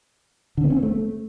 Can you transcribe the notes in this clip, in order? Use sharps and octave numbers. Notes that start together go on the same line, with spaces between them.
D3
B3
C#4
C4
A3